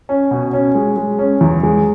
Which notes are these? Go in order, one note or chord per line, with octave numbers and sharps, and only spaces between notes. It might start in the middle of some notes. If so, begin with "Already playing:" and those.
C#4
B2
C#4
G#3
G#3
C#4
E2
G#3